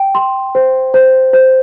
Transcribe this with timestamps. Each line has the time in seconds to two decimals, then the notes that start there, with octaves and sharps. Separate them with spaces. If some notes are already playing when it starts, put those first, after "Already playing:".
Already playing: G5
0.15 C6
0.55 C5
0.94 C5
1.33 C5